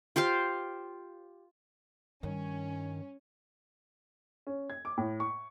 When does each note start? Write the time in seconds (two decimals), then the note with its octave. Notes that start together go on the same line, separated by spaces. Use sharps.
0.16 F4 G4 C5 F5
2.23 G2 D#3 C#4
4.47 C#4
4.70 G#6
4.85 D6
4.98 A2
5.20 C#6